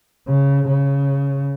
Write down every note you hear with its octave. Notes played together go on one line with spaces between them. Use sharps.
C#3
C#3